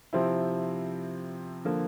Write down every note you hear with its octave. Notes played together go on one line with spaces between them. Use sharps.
C3 F3 C4 E4
D3 F3 A#3